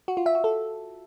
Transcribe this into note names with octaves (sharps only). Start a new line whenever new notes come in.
F#4
F4
E5
F#4
A4